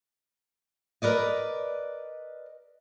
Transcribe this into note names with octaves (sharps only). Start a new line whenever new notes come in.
A#4 B4 D5 D#5